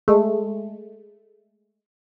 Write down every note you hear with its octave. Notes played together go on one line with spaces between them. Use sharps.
G#3 A3